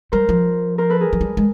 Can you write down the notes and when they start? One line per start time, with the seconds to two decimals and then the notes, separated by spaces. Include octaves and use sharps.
0.12 G3 A#4 C5
0.29 F3
0.78 A#4 C5
0.90 A4 B4
1.01 G#4 A#4
1.13 F#3
1.21 G3
1.37 G#3